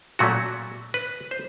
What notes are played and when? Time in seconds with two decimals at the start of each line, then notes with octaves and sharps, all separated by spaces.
0.19 A#2 F#3 A3 C#4 F#4
0.94 B4
1.31 C5